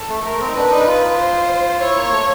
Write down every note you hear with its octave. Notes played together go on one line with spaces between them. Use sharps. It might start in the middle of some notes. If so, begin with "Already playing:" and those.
Already playing: A4
A3
A3 A#4
C4
D#4
D4 B4
D#4
F4
C5
E4 C#5
A#3
A3